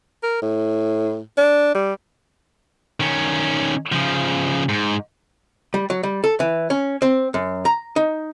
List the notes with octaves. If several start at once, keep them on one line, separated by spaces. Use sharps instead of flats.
A#4
A2
D4
G3
D#3 C#4
C#3 F3
G#2
G3
F#3
G3
A4
E3
C#4
C4
F#2
A#5
D#4